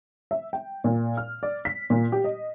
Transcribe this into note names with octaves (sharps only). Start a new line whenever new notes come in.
E5
G5
A#2
F6
D5
B6
A#2
G4
D#5